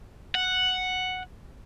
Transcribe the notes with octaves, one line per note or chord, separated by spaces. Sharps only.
F#5